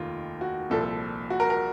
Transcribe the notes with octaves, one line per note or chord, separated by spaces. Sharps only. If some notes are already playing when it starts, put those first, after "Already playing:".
Already playing: F1 D#2 D#3 F4
F#4
C2 A#2 F3 A4
A4
F#4
A#4
A#4